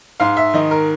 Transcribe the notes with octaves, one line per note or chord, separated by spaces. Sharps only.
G#2 F5
E5
D#3 D#5
A#4